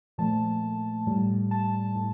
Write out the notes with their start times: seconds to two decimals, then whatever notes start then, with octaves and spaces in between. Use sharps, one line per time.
0.18 A#2 F3 A3 A5
1.07 A2 G3
1.51 A5
1.95 A2